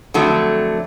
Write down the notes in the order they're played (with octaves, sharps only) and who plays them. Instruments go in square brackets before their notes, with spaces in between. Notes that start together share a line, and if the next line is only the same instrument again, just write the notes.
[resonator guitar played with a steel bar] F2 D3 F#3 A3